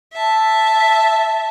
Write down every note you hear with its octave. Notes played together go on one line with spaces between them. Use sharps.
E5 A5